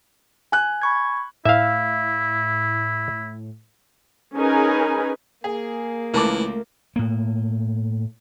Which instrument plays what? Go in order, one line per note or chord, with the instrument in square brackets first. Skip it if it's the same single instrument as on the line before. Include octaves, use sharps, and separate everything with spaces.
[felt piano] G#5 F#6
[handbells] B5 C#6 G#6
[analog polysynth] A2 [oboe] E4 [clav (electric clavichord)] E5 F5
[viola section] C#4 D#4 G#4 A#4 B4 G#5
[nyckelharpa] A#3 [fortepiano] G#4
[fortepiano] C#2 A5 D6 [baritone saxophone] E3 [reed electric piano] A3 A#4
[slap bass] A2 A#3